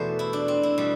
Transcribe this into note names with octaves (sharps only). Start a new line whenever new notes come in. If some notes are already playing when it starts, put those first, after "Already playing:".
Already playing: E2 B2 A3 C5 D5
E4
D4
C4
E4
B2 G3